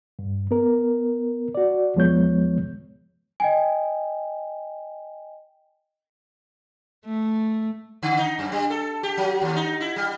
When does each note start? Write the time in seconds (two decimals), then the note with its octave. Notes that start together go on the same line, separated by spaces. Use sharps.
0.19 G2
0.51 B3 A#4
1.55 F#4 D5
1.96 E2 F3 G#3 B3 C#5 G6
3.40 D#5 G5 G#5
7.05 A3
8.03 D3
8.18 D#4
8.39 F#2
8.52 G3
8.70 A4
9.03 G4
9.17 F#3
9.41 D#2
9.56 D#4
9.80 E4
9.96 G3